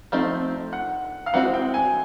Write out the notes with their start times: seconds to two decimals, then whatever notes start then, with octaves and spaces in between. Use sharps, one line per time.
0.12 F3 A3 C4 D#4
0.73 F#5
1.26 F5
1.34 E3 G#3 C4 D#4 F#4 F#5
1.54 G5
1.74 G#5